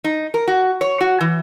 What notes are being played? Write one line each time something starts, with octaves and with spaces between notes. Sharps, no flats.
D#4
A#4
F#4
C#5
F#4
E3